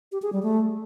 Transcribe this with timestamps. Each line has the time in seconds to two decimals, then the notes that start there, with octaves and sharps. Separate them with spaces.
0.12 G4
0.22 G#4
0.32 G3
0.43 A3